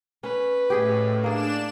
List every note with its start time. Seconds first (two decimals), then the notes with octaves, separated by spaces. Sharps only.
0.23 C#4 B4
0.70 A2 G4 G#4 D#5
1.24 A#3 D4 G#4 E7